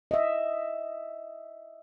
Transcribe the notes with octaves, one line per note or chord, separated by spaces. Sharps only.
D#5 E5